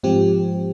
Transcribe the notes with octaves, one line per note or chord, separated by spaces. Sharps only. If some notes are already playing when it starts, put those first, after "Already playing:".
G#2 F3 C4 G4